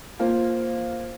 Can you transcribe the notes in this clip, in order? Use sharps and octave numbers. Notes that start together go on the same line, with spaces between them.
A#3 F4 C5